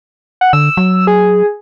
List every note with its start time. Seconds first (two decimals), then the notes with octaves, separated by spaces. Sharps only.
0.41 F#5
0.53 D3 E6
0.77 F#3
1.07 G#4